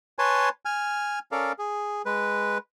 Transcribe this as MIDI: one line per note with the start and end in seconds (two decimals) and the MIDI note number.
0.19 0.49 71
0.19 0.49 73
0.19 0.49 80
0.19 0.49 81
0.19 0.49 84
0.65 1.19 80
0.65 1.19 89
1.32 1.52 61
1.32 1.52 69
1.32 1.52 70
1.32 1.52 74
1.32 1.52 77
1.59 2.02 68
2.06 2.58 56
2.06 2.58 71